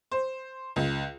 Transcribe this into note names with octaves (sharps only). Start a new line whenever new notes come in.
C5
C#2